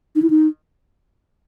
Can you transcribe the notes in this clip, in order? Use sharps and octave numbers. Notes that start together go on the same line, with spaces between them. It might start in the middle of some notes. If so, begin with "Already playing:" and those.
D#4
E4
D#4